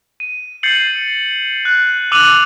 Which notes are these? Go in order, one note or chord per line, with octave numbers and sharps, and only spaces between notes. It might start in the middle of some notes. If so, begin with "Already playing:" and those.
D#7
G6 A6 C7 C#7 F#7
F#6
D6 E6 F#6 D#7 F7 F#7